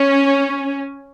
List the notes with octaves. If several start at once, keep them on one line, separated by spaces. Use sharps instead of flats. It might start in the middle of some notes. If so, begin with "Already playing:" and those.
Already playing: C#4